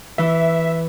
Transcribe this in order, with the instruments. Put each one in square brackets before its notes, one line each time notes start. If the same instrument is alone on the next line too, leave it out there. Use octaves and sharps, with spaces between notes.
[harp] E3 [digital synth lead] E5